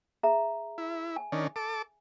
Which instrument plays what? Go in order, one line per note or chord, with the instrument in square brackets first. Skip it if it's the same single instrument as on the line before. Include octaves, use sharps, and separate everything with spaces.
[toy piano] G#4 E5 A#5
[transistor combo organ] E4
[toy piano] G#5
[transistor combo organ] D#3 C#4 D4
A4 D6